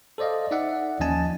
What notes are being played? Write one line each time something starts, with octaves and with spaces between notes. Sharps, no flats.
A4 C5 D5 D#5 F5
D#4 D5 E5 F#5
D#2 F3 C#4 D#5 G#5 A5